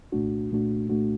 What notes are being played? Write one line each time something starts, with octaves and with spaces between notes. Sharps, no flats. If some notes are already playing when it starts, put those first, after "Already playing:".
C2 A#2 A3 D4 F#4
C2 A#2 A3 D4 F#4
C2 A#2 A3 D4 F#4